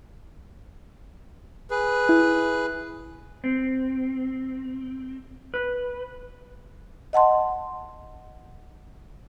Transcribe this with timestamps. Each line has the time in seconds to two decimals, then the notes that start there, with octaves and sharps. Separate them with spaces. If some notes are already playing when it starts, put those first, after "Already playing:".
1.70 G#4 B4
2.09 E4
3.44 C4
5.54 B4
7.13 D#5 F#5 A5 C6